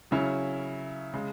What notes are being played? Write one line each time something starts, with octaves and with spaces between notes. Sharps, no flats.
C#3 F#3 C#4 E4
C#3 G#3